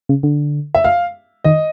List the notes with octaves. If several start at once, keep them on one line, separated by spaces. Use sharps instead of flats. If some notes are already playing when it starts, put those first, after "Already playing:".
C#3
D3
E5
F5
D#3 D#5